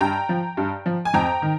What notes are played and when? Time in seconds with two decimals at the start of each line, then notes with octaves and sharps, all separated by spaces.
0.01 G2 G5 A#5
0.29 F3
0.57 G2
0.86 F3
1.05 G#5
1.13 F2 G5 A#5
1.42 D#3